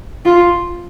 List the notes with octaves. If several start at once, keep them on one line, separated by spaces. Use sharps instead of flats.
F4